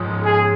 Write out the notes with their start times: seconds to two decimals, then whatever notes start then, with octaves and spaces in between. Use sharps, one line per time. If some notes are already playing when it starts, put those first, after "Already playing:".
Already playing: G#2 F3 G#3 C#4
0.24 G#4